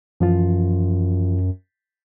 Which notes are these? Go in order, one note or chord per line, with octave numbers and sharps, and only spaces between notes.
F#2 E3 F3 F4